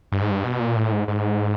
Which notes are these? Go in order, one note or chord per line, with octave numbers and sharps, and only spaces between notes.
G2
G#2
G2
B2
A#2
A2
G#2
G#2